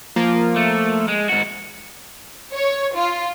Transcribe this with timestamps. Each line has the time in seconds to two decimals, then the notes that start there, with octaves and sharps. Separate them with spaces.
0.16 F3 A#3 F4
0.56 A3
1.08 G#3
1.29 G#2 F#4
2.54 C#5
2.95 F4